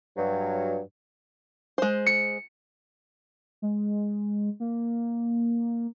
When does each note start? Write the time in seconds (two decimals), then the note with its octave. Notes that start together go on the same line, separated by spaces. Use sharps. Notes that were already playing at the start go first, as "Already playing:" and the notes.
0.16 G2 F#3
1.78 G#3 C5
2.06 C#7
3.62 G#3
4.60 A#3